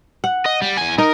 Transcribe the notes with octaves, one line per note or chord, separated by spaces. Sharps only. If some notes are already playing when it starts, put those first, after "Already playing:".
F#5
D#5
G3
E2 G#5
D#4 A#4